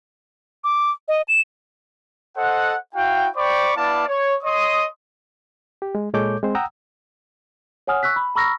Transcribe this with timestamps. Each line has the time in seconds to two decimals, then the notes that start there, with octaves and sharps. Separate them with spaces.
0.64 D6
1.08 D#5
1.28 E7
2.37 A4 C5 D#5 F#5
2.95 E4 F#4 F5 G5
3.36 C5 D5 G5 B5 C#6 D6
3.77 B3 E4 D5 F5 A5 D6
4.08 C#5
4.44 C#5 D#5 C6 D#6
5.82 G4
5.95 G#3
6.14 A#2 G#3 A4 C#5 D6 G6
6.43 G#3 C4 C5
6.55 F#5 G5 A#5 D#6 E6
7.87 C#5 F#5 G#5 D#6 F6
8.03 C#6 E6 F#6 B6
8.16 B5
8.35 A#5 B5 C#6 E6 F6 A#6